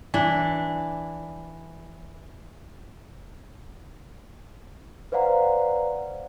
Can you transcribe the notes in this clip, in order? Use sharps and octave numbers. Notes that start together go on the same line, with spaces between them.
E3 D4
B4 C5 D5 F5 F#5 A#5